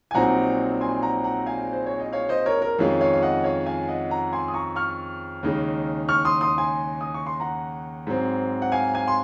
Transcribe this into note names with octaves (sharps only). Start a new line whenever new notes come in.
G#5
A#1 A#2 F#3 C4 D#4 F#5 A#5
G#5 C6
F#5 A#5
F#5 A#5
F5 G#5
C5
C#5
D#5
C#5 F5
C5 D#5
A#4 C#5
A#4
F2 D#3 G#3 C#4 F4
C#5 F5
F5
D#5 F#5
C#5 F5
F5 G#5
D#5 F#5
F#5 A#5
G#5 C6
D#6
A#5 C#6
C#6 F6
D#2 C#3 G#3 D#4
C#6 F6
C6 D#6
C6 D#6
G#5 C6
D#6
C#6
C6
F#5 A#5
G#2 F#3 C4
F#5
F5 G#5
F5 G#5
C6